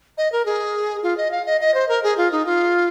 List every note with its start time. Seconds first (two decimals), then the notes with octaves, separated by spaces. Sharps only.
0.18 D#5
0.32 A#4
0.46 G#4
1.03 F4
1.18 D#5
1.31 F5
1.46 D#5
1.61 D#5
1.74 C5
1.89 A#4
2.03 G#4
2.17 F4
2.32 D#4
2.46 F4